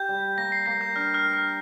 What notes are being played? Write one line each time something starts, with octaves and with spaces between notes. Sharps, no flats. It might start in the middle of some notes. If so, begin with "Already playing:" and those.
Already playing: G4 G6
G3
A#3 A#6
C7
A#3 A#6
G6
D4 F6
F6
A#4
F6